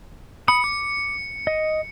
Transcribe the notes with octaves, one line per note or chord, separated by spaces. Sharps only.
B5 D#6 C#7
D6
D#5